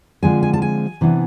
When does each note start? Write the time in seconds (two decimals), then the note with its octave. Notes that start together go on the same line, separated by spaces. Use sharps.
0.23 D3 F3 G#3 C4 G#5
0.43 G#5
0.53 A5
0.62 G#5
1.01 C3 E3 B3 D4